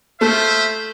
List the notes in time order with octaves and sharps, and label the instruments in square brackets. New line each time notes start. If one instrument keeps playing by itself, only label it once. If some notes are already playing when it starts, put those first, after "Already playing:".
[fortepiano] A3 [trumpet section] F4 C5 E5